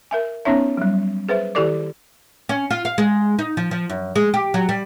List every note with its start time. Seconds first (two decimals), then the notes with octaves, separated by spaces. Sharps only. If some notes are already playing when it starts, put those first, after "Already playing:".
0.11 A#4 E5 G#5
0.45 B3 C#4 D#4 C#5 E5
0.77 F#3 G3
1.29 G#4 B4 C5 E5
1.55 D#3 E4 G4 A4 D5 D6
2.49 C#4
2.70 F4
2.85 F5
2.98 G#3
3.39 D#4
3.57 F3
3.71 F3
3.90 F#2
4.16 G#3
4.34 G4
4.54 F#3
4.69 G3